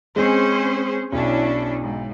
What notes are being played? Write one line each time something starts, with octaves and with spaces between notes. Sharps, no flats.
G#3 C4 C#4 G#4 C5
B1 C#4 D4 E4
G#2